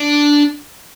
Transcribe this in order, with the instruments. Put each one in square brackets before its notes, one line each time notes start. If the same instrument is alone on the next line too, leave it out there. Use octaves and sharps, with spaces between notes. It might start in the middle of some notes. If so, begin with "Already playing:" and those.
Already playing: [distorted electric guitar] D4